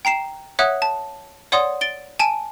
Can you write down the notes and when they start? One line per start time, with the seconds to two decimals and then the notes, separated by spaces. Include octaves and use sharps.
0.05 G5 A#5 C7 E7
0.59 C#5 E5 F#5 D#6 F#6
0.82 A5
1.52 C#5 D5 F#5 C6 D#6
1.81 A6 D7 G7
2.19 G#5 A5 D7 D#7